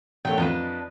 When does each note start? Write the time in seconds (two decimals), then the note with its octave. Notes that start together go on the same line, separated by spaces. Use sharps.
0.25 B1 A3 C#5 G5
0.38 F2 D4 D#4 B4